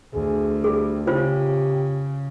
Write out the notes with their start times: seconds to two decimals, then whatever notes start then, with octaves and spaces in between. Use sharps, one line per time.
0.14 D2 G#4
0.64 G3 G#4
1.07 C#3 F4 G4 C5